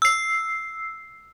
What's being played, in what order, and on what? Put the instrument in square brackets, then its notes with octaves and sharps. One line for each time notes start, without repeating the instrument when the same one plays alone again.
[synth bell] E6 C7